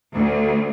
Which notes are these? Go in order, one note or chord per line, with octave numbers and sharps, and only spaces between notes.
D2